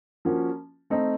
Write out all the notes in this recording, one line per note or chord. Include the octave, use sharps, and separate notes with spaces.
F3 A#3 C#4 F#4
A3 C4 D#4